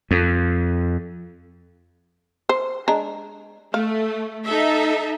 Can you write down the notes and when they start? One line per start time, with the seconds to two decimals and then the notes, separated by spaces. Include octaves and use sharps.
0.11 F2
2.49 C5
2.88 G#3 D4 A#5
3.74 A3 F5
4.46 D#4 A4 E5